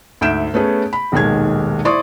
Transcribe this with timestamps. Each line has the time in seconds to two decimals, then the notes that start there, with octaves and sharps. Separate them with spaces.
0.21 D2 G#2 E5 G6 D7 E7
0.54 A3 B3 C#4 G#4 C#5
0.93 B5
1.12 D#1 B1 D#3 G#3 G#6
1.85 E4 C5 D5 C6 C#6 D#6